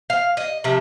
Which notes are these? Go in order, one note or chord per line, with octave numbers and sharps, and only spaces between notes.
F5
D#5
C3 F3 E5